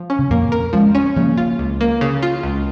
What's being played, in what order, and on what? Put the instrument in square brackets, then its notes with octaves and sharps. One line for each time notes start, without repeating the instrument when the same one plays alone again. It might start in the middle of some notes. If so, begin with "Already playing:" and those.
Already playing: [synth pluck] F3
C#4
[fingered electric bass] C#3
[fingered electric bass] F2 A#2 [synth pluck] A#3
[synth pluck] A#4
[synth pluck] F3 [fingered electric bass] G#3 C#4
[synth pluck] C#4
[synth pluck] C#3 [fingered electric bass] F3 A#3
[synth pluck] F4
C#2
A#3
C#3
F4
C#2